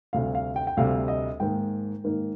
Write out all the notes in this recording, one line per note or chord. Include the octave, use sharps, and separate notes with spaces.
D2 C3 G3 F5
F5
G5
G5
D2 C3 G3 F5
D#5
G#2 D#3 A#3 D#4 G5
G#2 D#3 A#3 D#4